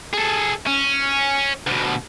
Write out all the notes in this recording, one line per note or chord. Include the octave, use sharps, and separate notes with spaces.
G#4 A4
C#4
D2 B2